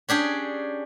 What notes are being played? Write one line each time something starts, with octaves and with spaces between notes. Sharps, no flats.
C#4 D4 G4 G#4